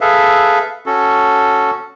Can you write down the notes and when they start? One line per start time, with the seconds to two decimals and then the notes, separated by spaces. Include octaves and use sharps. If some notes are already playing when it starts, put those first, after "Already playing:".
0.01 G#4 A4 B4 E5 F5
0.86 C#4 F#4 A4